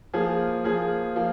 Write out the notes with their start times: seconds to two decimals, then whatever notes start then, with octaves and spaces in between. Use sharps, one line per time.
0.14 F3 A#3 G#4
0.64 F3 A#3 G#4
1.16 F3 A#3